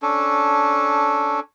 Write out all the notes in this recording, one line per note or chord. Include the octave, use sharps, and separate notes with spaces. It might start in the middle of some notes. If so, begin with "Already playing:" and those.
C#4 D4 A4